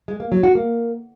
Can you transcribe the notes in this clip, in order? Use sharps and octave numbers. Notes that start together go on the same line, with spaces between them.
G#3
A#3
F#3
F#4
A#3